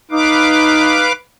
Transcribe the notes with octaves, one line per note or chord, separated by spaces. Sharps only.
D#4 B4 F5 D6